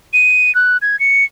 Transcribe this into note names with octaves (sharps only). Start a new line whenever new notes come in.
D#7
F#6
G#6
C#7